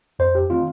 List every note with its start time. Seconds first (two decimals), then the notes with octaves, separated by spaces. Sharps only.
0.19 F2 C5
0.35 G4
0.50 D#3 A3 C4 F4